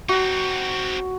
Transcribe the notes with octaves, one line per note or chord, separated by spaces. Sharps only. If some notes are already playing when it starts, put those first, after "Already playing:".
C4 D#4 F#4